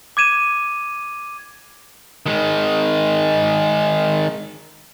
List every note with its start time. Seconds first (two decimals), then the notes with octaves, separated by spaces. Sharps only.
0.17 D6 G#6 D#7 E7
2.26 D#3 G#3